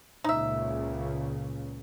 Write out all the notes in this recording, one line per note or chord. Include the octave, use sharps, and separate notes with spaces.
C#2 A#2 C#3 D#4 E5